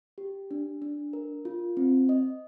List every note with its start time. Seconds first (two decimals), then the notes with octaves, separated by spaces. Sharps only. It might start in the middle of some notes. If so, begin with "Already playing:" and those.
0.18 G4
0.51 D4
0.82 D4
1.13 A#4
1.45 F4
1.77 C4
2.09 D#5